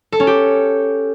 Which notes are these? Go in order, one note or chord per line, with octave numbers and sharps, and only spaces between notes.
A4
C#4
G4